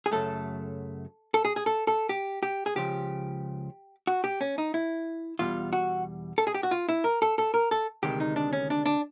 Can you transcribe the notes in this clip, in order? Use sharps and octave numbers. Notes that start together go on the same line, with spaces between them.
G#4
F#2 C#3 F#3 A3 A4
A4
G#4
G#4
A4
A4
G4
G4
G#4
C#2 C#3 F3 G4
F#4
G4
C#4
D#4
E4
E2 B2 G3 F4
F#4
A4
G#4
G4
F#4
F4
E4
A#4
A4
A4
A#4
A4
D2 C3 D#3 G#3 G4
D#4
D4
C#4
D4
D4